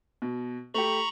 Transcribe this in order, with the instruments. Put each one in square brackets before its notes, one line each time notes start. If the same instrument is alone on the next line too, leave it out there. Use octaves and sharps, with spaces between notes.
[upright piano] B2
[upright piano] A3 G4 [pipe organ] A#5 B5 C#6